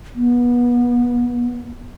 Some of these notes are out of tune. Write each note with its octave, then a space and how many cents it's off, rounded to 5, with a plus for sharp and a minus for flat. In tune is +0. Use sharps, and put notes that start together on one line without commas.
B3 -30